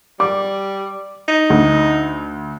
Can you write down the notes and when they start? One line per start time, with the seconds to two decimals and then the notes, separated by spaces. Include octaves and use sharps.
0.20 G3 D6
1.28 D#4
1.50 D2